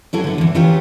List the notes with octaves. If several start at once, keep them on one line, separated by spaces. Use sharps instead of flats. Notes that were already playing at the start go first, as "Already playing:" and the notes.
F#3 G3 E4 G#4 A4
D3 B3
E2 E3
E3 B3 C#4 F4 G4 A#4